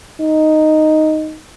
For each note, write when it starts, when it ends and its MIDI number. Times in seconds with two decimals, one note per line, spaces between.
0.21 1.37 63